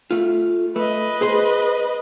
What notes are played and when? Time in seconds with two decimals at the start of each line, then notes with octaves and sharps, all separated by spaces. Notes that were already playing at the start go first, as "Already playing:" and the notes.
0.11 A3 F4
0.76 A3 B4 D#5
1.21 G#4 C5 C6